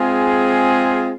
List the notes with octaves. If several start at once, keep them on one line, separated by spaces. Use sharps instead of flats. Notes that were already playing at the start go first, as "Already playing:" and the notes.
Already playing: G#3 C4 F4 G#4